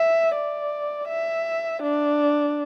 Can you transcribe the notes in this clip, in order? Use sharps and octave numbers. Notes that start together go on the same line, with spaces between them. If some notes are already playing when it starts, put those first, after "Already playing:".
Already playing: E5
D5
E5
D4